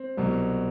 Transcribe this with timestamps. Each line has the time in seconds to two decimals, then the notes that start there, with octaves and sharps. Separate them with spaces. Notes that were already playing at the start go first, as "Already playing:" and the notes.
Already playing: C4
0.17 C2 B2 F#3